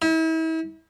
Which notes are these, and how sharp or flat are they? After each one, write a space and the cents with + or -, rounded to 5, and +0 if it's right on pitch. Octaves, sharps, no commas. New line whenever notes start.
E4 -40